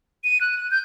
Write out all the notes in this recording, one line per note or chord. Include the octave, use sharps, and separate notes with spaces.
D#7
F#6
G6